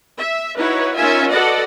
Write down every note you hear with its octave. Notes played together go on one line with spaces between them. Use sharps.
E5
D#4 E4 F#4 B4 C#5
C#4 D#4 F4 A#4 E5 G#5
F#4 A4 B4 D5 D#5 F#5